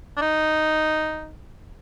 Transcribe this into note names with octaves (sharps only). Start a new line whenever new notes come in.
D4
D#4